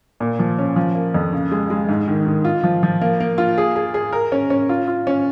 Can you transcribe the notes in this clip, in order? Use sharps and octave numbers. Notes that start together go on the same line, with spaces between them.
A#2
F3
C#4
F3
A#3
F2
C#3
G#3
G#3
G#2
D#3
D#3
F4
F3
F3
A#3
A#3
F4
G#4
G#4
G#4
A#4
C#4
C#4
F4
F4
C#4